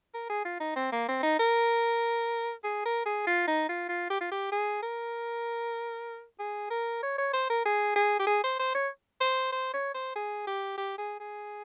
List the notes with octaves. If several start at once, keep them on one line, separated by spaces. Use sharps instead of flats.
A#4
G#4
F4
D#4
C4
A#3
C4
D#4
A#4
G#4
A#4
G#4
F4
D#4
F4
F4
G4
F4
G4
G#4
A#4
G#4
A#4
C#5
C#5
C5
A#4
G#4
G#4
G4
G#4
C5
C5
C#5
C5
C5
C#5
C5
G#4
G4
G4
G#4
G#4